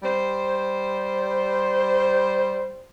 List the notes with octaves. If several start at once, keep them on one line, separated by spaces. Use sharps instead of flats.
G3 C5